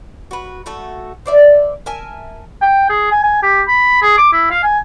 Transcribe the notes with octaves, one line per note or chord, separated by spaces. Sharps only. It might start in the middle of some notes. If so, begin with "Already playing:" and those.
F#4 B4
A3 F#4 A4
C5 D5 E5
A#4 E5 G#5 A5
G5
G#4
G#5
G#5
G4
B5
G#4
D6
E4
F5
G#5